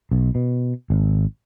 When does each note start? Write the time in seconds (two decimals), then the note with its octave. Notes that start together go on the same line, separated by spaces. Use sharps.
0.11 B1
0.35 B2
0.90 G#1